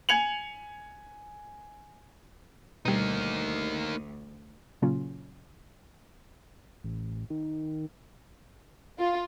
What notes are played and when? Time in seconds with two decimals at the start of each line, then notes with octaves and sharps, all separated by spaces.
0.09 G#5 G#6 C#7 F7 F#7
2.85 D2 B2 G3 A#3 D#4
4.82 A#2 C#3 F#3 A#3 C#4 F4
6.84 A1
7.30 D#3
8.98 F4